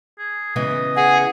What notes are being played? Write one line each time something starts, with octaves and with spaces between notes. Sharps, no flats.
G#4
C#3 E3 B3 D#5
G#4 F#5